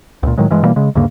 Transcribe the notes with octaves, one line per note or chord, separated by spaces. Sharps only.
C#2 A#2
A2 D#3 F#3 G#3
G2 E3 G#3
B2 E3 G3 A#3
C#3 G#3
D2 G2 C#3 A#3